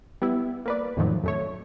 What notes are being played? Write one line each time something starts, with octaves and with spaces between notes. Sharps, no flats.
G3 B3 E4
A#3 B4 D5
F2 A2 D#3 F3 F#3
F#2 A3 C#5